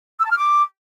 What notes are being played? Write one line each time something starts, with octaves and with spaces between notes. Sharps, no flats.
E6
A5
F6
D6